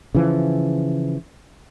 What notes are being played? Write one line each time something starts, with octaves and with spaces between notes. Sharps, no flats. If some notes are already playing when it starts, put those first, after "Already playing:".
C#3 E3 F3